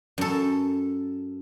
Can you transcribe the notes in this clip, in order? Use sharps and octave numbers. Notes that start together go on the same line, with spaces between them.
F#2 A4